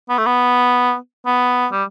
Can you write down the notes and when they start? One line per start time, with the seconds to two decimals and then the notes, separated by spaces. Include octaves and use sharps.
0.09 B3
0.18 A3
0.26 B3
1.26 B3
1.72 G3